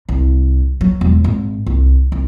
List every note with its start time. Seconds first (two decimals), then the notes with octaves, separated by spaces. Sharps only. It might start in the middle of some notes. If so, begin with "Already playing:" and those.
0.09 C2
0.81 F#3
1.01 E1
1.24 G#1
1.66 C2
2.12 C2